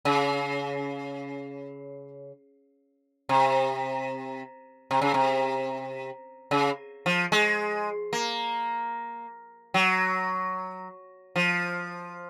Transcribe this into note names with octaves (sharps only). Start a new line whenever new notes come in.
C#3
C3
C3
C#3
C3
C#3
F3
G#3
A#3
F#3
F3